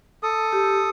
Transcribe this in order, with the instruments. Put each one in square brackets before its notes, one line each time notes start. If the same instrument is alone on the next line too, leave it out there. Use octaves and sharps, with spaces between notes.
[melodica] A4 D#6
[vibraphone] G4